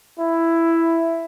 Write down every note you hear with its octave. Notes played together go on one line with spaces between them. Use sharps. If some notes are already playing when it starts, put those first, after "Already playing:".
E4